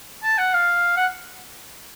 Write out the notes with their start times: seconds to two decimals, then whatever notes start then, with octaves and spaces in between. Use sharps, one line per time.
0.23 A5
0.38 F#5
0.54 F5
0.97 F#5